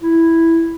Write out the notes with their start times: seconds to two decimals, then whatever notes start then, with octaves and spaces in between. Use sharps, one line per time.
0.02 E4